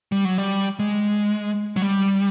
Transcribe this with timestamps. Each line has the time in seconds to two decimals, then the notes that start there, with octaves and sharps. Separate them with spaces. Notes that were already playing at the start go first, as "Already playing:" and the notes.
0.12 G3
0.25 F#3
0.38 G3
0.79 G#3
1.77 F#3
1.82 G3